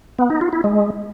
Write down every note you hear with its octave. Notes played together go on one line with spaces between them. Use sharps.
B3
D#4
F4
E4
G#3